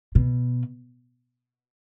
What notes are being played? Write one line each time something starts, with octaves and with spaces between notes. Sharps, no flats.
B2